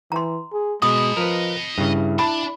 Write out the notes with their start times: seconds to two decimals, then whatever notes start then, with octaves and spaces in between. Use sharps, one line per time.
0.12 E3 A#5 C6
0.52 G#4
0.82 B2 G#3 D#5 B5 D#6
1.17 F3 A#4 B4
1.78 G2 C#3 E4
2.19 D4 A5 B5